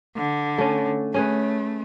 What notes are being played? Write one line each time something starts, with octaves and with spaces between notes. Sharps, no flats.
D3
A3 C#4
A3 C#4 G#4 B4